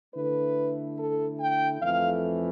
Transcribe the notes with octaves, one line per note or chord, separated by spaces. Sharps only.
D3 A3 E4 B4
A4
G5
F2 E3 A3 F5